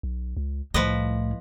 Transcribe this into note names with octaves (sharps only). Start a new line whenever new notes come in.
B1
C#2
C2 A2 F3 B4 D#5